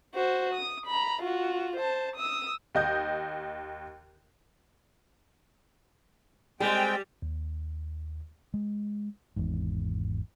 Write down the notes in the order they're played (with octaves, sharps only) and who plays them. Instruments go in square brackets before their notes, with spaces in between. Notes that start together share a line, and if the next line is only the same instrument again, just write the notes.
[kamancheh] F#4 C5
D#6
A#5 B5
F4 F#4
C5 A5
D#6 E6
[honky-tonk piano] D#2 D#5 G6
[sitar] G3 [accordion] G#3 C4 G5 [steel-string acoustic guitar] G4 G#4
[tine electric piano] D#2
[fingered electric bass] G#3
G#1 E2 G#2